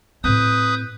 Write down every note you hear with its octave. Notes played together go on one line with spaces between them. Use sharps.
A2 C4 B4 D#6 G6